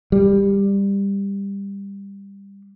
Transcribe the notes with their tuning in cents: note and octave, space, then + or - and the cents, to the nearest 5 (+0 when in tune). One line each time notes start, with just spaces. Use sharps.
G3 +20